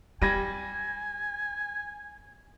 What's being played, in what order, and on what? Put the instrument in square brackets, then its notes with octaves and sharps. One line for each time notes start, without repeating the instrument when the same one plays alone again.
[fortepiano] G3 [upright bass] D#4 [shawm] G#5 [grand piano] G#6 A#6 D#7